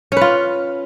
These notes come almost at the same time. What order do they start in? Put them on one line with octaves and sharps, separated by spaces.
C#4 B4 F4